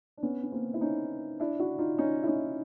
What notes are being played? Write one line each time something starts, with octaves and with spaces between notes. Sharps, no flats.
D4
B3 C#4
C#4
A#3 C4
E4
C#4 D#4
D4 E4
E4 F#4
D#4 F4
C#4 D#4
E4
C#4 D#4